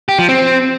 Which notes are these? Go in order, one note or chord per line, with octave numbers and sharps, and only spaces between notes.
G4
F3
C4